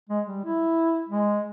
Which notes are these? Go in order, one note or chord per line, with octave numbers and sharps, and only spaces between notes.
G#3
G3
E4
G#3